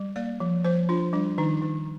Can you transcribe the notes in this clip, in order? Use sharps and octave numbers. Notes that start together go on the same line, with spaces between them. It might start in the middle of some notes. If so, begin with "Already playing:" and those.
Already playing: G3
A#3 D5
F3
F3 C5
D4 F4
G3 D4
D#3 D#4
D#3